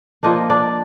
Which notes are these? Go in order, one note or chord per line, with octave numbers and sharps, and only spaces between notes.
F3 A#3 D4 D#4 D#5
D4 D5